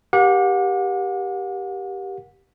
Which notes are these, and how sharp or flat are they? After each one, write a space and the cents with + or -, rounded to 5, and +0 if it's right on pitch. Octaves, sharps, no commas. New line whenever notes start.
G4 +0 A#4 +30 F#5 -40